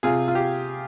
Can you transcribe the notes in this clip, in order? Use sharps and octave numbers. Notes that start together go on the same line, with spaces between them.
C3 F4 G#4
F4
G4